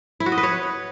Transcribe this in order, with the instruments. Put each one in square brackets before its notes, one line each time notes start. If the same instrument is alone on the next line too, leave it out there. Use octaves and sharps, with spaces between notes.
[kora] E4
F#4
D#5
B4
C#5